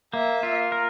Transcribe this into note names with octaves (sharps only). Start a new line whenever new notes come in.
A#3 E5
F4
A#4